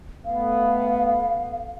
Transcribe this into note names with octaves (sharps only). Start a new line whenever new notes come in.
A3 B3 F5